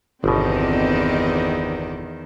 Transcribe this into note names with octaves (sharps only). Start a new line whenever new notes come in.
G1 E2 B2 D#3 C4 D5 D#5